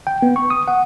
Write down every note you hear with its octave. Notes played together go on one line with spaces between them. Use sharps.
G5
B3
C#6
D#6
F#5